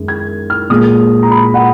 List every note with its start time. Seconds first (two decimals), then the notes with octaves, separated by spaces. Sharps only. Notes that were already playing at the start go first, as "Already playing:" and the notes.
Already playing: F#2 D#3 G#3
0.08 G#6
0.50 F6
0.70 A#2 G#3 D#6
1.23 A#5
1.31 B5
1.54 F#5